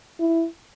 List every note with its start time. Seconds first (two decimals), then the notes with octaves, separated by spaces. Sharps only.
0.20 E4